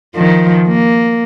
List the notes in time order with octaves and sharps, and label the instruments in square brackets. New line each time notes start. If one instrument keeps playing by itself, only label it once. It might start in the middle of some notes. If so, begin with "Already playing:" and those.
[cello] D#3 F3
A#3